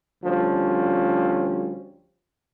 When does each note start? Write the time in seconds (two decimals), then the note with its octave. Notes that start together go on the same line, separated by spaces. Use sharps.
0.24 D2 F3 G3 C#4